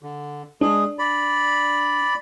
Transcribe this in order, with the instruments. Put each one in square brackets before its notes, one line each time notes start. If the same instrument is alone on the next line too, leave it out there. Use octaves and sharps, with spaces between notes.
[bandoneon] D3
[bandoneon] G#3 G#4 [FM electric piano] D4
[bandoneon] D5 B5